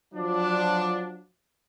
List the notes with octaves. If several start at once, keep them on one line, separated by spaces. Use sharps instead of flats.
F3 F#3 D4